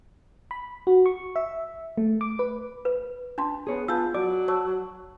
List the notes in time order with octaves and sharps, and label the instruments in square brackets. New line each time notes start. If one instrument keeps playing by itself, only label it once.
[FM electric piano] B5
F#4
C#6
E5
A3
D6
B4
[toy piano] B4
[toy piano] D4 [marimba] A5 C6
[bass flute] B3 [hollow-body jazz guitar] G#4 C#5
[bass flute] B3 [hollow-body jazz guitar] F4 [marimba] G#5 A5 G6 [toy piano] E6
[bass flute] F#3 [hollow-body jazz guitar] D5 [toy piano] D6
[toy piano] C#5 [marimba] A5 C#6 E6